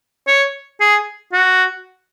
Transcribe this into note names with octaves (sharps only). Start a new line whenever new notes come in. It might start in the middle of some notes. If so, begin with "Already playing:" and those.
C#5
G#4
F#4